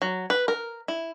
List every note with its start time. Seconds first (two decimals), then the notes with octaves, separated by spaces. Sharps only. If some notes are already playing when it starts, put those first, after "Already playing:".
0.02 F#3
0.30 B4
0.48 A#4
0.88 E4